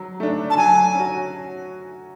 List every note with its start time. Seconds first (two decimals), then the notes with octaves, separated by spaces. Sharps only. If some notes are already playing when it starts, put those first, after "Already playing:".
Already playing: F#3
0.20 A3 D4
0.50 A5
0.57 F#3 G#5
0.95 C#4 F#4